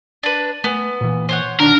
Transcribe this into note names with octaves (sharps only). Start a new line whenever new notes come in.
D4 B4
A3 B3 G#5
A#2 E3
C5 C#5 F#5
B1 D#3 D4 A#4 A#5